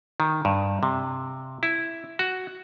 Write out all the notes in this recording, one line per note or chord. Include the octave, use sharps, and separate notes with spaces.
D#3
G2
C3
E4
F#4